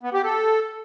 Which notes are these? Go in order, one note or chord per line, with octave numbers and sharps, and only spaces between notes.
B3
G4
A4